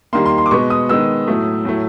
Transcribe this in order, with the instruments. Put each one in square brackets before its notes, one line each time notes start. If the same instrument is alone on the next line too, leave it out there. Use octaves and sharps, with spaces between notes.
[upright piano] D#3 G3 A#3 C6
C6
C6
D6
B2 G#3 B3 C#6
D#6
D#3 G#3 B3 E6
A2 F#3 A3
A2 F#3 A3